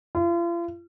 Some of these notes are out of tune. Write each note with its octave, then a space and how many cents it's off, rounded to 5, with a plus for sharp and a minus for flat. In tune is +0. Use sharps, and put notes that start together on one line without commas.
F4 -40